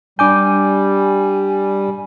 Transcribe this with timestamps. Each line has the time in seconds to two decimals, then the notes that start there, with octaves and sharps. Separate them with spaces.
0.19 G3 D4 G#5 D6 G6